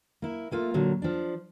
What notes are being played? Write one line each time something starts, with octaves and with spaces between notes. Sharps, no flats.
A#3 E4
A3 A#3 F4
A#2 D3 F#3
F3 D4